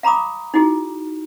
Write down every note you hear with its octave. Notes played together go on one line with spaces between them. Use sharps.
F5 A#5 B5 D6 D#6
D#4 E4 F#4 G#4